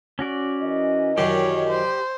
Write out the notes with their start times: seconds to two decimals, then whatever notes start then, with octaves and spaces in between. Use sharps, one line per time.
0.19 C#4 F#4 D5
0.61 E3 A#4 D#5
1.18 F#2 D#3 G4 C#5 D5
1.70 C5